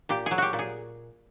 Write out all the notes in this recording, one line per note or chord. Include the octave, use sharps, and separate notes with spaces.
A#2 G4
F#3 G#4
F#4 G4
A#2
G#4